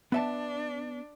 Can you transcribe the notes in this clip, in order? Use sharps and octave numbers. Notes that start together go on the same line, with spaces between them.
B3 D4 E5 A5